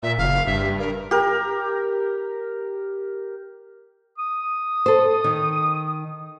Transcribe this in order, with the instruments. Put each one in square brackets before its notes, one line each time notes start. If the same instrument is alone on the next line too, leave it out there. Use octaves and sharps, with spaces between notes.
[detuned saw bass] A#2 [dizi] E5
[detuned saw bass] F#1 [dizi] F5
[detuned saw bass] G2 [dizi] E5
[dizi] A#4
[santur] G4 A#4
[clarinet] D#6
[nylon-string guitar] A4 C5
D#3